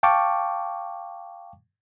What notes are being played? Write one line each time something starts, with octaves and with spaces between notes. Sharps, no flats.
F5 G5 A5 C#6 D6